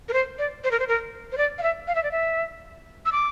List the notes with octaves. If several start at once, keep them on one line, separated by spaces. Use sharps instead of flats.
A#4
C5
D5
C5
A#4
C5
A#4
C5
D5
F5
E5
F5
E5
D5
E5
E6
D6